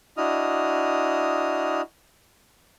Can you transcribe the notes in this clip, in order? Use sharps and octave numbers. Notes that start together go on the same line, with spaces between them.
D4 E4 F#4 D#5 D#6 F6